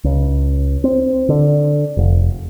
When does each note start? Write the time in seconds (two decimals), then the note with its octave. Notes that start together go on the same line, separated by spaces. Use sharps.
0.04 C#2
0.84 C4
1.29 D3
1.97 F1